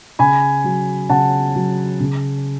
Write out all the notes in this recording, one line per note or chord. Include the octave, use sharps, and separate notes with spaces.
C#3 G#5 B5
F#3
C#3 F#5 A5
F#3
C#3